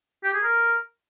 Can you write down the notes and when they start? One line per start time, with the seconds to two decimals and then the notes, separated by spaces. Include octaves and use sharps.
0.24 G4
0.33 G#4
0.43 A#4